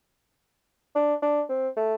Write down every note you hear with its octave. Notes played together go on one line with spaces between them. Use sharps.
D4
D4
C4
A3